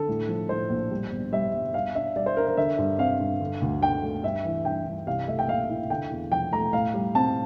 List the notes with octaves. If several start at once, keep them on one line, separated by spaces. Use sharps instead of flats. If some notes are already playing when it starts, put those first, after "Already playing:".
Already playing: D3 A4
A2
F3
A2 C5
A#1
G3
G1
G3 E5
G1
G3 F5
D4 E5
G3 D5
C5
D4 A#4
A#4
D3 E5
G2
C4 F5
G2
D3
D2
D3 G5
A3
G2 E5
E3
G2 G5
G2
C2 F5
A3 E5
G5
A#2 F5
E4
D3 G5
E2
F3 G5
A3 A#5
A2 F5
G3
C4 A5